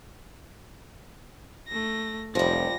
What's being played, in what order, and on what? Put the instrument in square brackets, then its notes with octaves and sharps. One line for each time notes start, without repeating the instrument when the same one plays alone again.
[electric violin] A3 A#6
[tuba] F1 [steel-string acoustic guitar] F3 G3 [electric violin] A#6